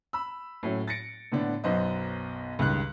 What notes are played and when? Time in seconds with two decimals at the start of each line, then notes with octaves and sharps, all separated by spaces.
0.13 B5 E6
0.63 A2 F#3 C#4 E4
0.88 A6 A#6 C#7 D7
1.32 A2 D3 B3 D4
1.64 B1 F#2 B3 C5 D#5
2.59 C#2 G2 D#3 F#6